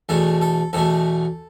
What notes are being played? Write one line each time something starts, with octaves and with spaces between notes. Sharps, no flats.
E2 B2 A3 A4
A4
E2 B2 A3 A4